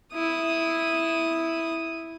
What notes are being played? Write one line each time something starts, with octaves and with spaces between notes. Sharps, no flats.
E4 D#6